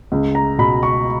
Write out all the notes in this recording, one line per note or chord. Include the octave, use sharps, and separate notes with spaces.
C#2
A#5
B2 B5
C#6